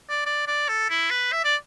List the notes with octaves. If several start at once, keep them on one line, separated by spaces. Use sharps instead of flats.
D5
D5
D5
A4
E4
B4
E5
D5